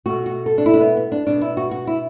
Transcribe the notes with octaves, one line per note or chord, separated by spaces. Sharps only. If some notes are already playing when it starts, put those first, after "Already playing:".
B2 A3 F#4
F#4
A4
D4
E4
D4
B3
B3
D4
B2 B3 D4
E4
F#4
F#4
E4